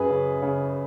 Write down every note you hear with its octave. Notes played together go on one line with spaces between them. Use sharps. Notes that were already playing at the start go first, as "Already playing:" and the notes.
Already playing: F#2 G#4 B4
C#3
C#3